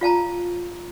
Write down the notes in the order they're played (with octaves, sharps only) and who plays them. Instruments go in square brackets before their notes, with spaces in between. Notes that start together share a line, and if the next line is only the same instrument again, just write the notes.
[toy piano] F4 F5 A5 A#5